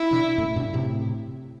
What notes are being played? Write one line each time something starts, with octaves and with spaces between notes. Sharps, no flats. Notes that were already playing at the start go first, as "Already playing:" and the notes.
Already playing: E4
B2 D3
F#2 A2
G2 B2
A2 C3